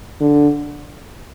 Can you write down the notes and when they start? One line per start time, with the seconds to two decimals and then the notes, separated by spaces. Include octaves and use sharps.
0.21 D3